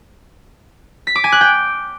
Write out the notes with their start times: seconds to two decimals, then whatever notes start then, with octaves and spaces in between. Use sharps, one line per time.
1.07 B6
1.15 D6
1.24 G#5
1.32 F#6
1.41 G5